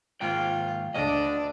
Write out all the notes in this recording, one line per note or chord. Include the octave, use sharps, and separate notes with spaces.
D#2 G#2 F4 G5
D2 D3 D4 D#5